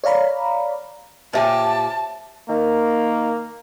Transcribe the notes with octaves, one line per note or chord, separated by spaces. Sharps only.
C#5 D5 F5 A#5 B5
A#2 G4 C5 C#5 E5 G#5 A5
D#3 A#3